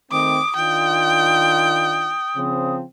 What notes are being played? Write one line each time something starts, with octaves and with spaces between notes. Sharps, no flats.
D#3 A3 C4 D6 D#6
D#3 D4 F4 G5
C#3 F3 C4